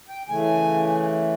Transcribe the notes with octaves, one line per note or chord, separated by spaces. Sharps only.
G5
C#3 E3 A3 G#5